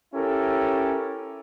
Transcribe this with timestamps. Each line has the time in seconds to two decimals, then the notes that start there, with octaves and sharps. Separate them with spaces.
0.14 C#4 E4 G4 A4 A#4